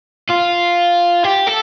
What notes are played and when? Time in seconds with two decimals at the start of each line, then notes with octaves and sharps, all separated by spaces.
0.30 F4
1.24 G4
1.47 A4